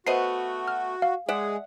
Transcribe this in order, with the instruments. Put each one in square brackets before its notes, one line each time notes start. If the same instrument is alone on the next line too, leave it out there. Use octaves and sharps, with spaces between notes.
[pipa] A3 B3 D#5 [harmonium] F#4 [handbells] C5 C7
[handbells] F6
F5
[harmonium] G#3 G#4 [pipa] D5 E5 F#5